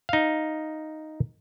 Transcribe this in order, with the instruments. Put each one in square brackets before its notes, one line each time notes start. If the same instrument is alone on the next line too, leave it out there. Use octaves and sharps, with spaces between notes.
[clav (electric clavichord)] D#4 F5